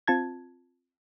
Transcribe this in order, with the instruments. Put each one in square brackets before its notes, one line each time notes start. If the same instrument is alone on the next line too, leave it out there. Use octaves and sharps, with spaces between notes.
[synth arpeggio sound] C4 F4 A5 G#6